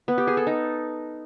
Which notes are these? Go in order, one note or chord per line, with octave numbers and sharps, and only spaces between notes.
B3
G4
G#4
A4
D#4